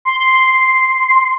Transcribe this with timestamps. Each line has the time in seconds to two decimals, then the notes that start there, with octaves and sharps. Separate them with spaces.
0.05 C6